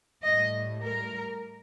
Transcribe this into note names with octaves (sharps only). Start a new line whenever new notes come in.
A2 G3 D#5
A#4